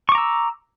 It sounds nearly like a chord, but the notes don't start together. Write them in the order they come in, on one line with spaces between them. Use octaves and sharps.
C#6 D6 A#5 E6